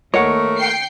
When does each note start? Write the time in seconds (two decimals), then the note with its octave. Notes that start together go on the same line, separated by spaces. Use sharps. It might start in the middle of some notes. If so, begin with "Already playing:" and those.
0.14 D#2 A3 A#4 C#5 D#5 F#5
0.56 G5 C7 C#7